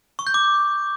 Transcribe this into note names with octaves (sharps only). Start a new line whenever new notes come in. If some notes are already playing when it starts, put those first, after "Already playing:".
C#6
G6
D6